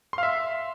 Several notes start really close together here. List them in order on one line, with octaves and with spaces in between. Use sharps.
C6 F5 E5